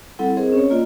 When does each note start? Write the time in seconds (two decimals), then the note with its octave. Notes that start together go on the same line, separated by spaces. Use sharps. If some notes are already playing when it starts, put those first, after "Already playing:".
0.19 G3 C4 E4 A4 F#5
0.37 C4 G#4 A#4 C5 D#5
0.52 C#4 C#5
0.70 A#3 F4 D5 D#5